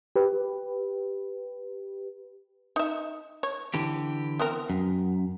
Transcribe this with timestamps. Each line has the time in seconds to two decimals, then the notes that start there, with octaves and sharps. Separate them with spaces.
0.16 G4 B4
2.76 D#4 E5
3.43 C#5
3.74 D3 E3 G4
4.39 B3 C4 A#4
4.70 F#2